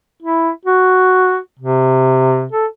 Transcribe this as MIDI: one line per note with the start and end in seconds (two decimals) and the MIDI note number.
0.22 0.50 64
0.65 1.39 66
1.59 2.47 48
2.52 2.66 69